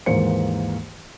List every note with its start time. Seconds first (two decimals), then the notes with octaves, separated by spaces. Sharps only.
0.06 D#2 G#2 E3 A#3 C5 C#7